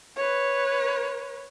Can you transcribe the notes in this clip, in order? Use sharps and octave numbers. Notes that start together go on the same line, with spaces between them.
B4 C#5